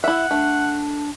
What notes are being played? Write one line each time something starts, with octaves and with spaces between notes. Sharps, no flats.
E4 E5 F#5
A3 D4